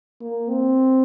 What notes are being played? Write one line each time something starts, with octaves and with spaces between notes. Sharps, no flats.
A#3
C4